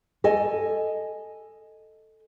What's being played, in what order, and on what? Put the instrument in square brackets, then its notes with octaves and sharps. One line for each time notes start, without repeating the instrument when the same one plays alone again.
[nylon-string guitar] A4 D#5 G#5